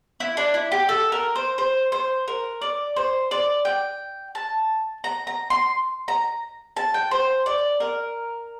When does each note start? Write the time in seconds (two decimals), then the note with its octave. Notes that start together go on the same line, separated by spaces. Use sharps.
0.20 E4
0.37 D4
0.54 E4
0.72 G4
0.89 A4
1.12 A#4
1.35 C5
1.58 C5
1.92 C5
2.28 A#4
2.62 D5
2.96 C5
3.31 D5
3.65 G5
4.35 A5
5.04 A#5
5.27 A#5
5.50 C6
6.08 A#5
6.77 A5
6.94 G5
7.11 C5
7.46 D5
7.80 A#4